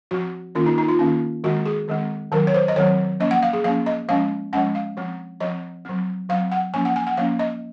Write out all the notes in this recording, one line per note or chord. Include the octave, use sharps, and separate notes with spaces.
F3 C4 F#4
D#3 A#3 C#4 F4
D#4
D#4
F4
D#3 A#3 C#4
D#3 G#3 C4 F#4
G#4
D#3 G#3 C4
D#3 F#3 C4 A#4
C#5
C5
D#5
D#3 F#3 C4 C#5
F3 A#3 C#4 D#5
F#5
F5
G#4
F3 A#3 C#4 F5
D#5
F3 G#3 C#4 F5
F3 G#3 C#4 F#5
F5
F3 C4
F3 C4 D#5
F#3 C4
F#3 C4 F5
F#5
F3 A#3 C#4 G#5
F#5
G#5
F#5
F3 A#3 C#4 F5
D#5